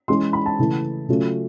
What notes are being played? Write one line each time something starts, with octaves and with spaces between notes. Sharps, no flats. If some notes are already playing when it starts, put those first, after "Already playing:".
E3 G#3 C#4 C6
B5
A5
C#3 E3 A3
C#3 F#3 A3 C#4 F4